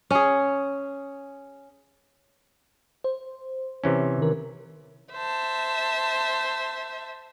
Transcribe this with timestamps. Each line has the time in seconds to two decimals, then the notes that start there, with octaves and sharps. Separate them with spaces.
0.10 C#4 G#4
3.04 C5
3.84 C3 E3 C#4
4.19 D#3 A#4
5.13 C5 E5 A5